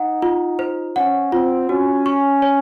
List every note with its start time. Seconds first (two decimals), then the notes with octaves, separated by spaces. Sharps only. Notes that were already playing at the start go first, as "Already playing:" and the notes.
Already playing: D#4 F#5
0.22 F4
0.59 C5
0.96 C#4 F#5
1.32 C4 F4
1.69 C#4 F#4
2.06 C#6
2.42 C#5